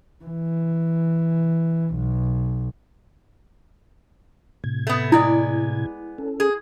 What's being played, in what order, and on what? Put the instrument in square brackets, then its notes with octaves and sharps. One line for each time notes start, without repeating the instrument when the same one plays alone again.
[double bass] E3
B1
[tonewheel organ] A2 C3 G#6
[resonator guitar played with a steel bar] A3 B3
[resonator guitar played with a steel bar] G#3 B3 D5 [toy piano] E4
[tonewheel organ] C#4 A4
[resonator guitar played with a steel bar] G#4